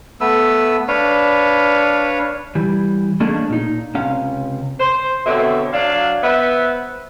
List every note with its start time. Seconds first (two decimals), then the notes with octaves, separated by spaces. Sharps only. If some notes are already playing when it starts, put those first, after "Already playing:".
0.21 A3 B3 B4 E6
0.88 D4 B4 C#5 F5
2.55 E3 G3
3.20 A3 A#3 C#4 D4 G#4 D#5
3.50 A#2 D#4
3.94 C#2 C3 C#4 F5
4.80 C5
5.27 B2 D3 C4 C#5 E5
5.73 F#3 D4 F5
6.23 B3 B4 C5 E5